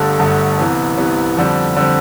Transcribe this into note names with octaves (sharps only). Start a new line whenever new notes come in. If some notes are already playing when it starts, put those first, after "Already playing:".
Already playing: G1 G2 D3 A3
G1 G2 D3 A3
C2 C3 E3 B3
C2 C3 E3 B3
F2 D3 G3 C4
D3 G3 C4